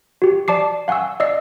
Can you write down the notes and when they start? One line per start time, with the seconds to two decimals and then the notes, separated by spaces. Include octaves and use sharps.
0.22 F#4 G4
0.48 D5 A5 D6 C7
0.88 F5 F#5 G#5 C#6 E6
1.20 D5 D#5 E6 C7